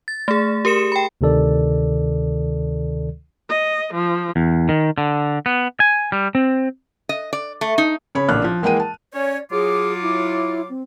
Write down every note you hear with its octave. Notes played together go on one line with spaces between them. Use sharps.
A6
A3 G#4
G4 A#4 C#7 E7
G5 B5
D2 C3 D#3 A4 D5
D#5
F3
E2
D#3
D3
B3
G#5
G3
C4
D#5
D5
A3
D#4
C#3 C#5 B5
A1 A#2 D4 F6 F#6
F3
E3 G#3 A#3 F#5 G5 D#7
A5
C#4 C#5 D5
F#3 F4 G#4 D6
E4
C4